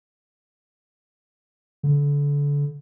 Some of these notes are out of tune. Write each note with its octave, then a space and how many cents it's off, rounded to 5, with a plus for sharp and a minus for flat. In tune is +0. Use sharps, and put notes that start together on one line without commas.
D3 -30